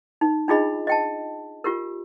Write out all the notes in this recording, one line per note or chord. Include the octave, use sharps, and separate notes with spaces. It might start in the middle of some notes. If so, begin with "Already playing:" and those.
D#4
D4 D#4 F4 G#4 D#5 B5
D#5 G5 A5
F4 G4 A#4